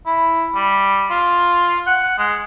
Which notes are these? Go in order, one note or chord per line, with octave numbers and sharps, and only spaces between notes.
E4
G3
F4
F#5
G#3